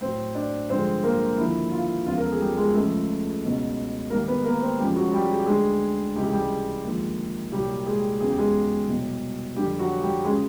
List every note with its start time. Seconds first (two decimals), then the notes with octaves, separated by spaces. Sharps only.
0.01 A2 F#3 C4 C5
0.35 D4 D5
0.69 G2 D3 F3 G#3 C4 C5
1.03 A#3 A#4
1.37 D#2 D3 F3 E4
1.71 F4
2.05 E2 C#3 F3 G#3 F4
2.18 A#4
2.25 A4
2.32 G#4
2.40 G3 G4
2.57 G#3 G#4
2.74 C#2 C#3 F3 A3 A4
3.43 C#2 B2 F#3
4.10 G#2 D#3 G3 A#3 A#4
4.28 B3 B4
4.44 A#3 A#4
4.62 C4 C5
4.78 F#2 C#3 F3 G3 G#3 G4
4.96 F#3 F#4
5.13 G3 G4
5.30 G#4
5.39 G4
5.46 D2 D3 G3 G#3 G#4
6.15 C#2 C3 E3 G3 G4
6.23 G#4
6.32 G3 G4
6.83 D#2 D3 F3 G#3
7.52 C2 A#2 F#3 G3 G4
7.86 G#3 G#4
8.20 E2 C#3 F#3 G#4
8.30 G4
8.38 G#3 G#4
8.88 C2 B2 F#3
9.56 F2 D3 G3 G4
9.79 F#3 F#4
10.02 G3 G4
10.24 C#3 F#3 G#3 G#4